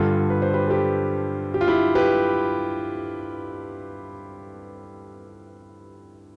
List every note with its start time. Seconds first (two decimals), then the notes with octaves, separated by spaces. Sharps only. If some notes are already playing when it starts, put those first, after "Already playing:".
Already playing: G2 D3 F4 A4
0.30 B4
0.42 C5
0.53 G4 B4
0.67 A4
0.71 G4 B4
1.54 G4
1.61 F4
1.67 E4 G4
1.95 G4 B4